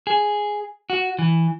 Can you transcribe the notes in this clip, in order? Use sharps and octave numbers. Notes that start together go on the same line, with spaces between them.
G#4
F#4
E3